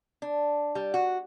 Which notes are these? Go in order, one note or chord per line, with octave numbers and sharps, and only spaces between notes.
D4
G3
F#4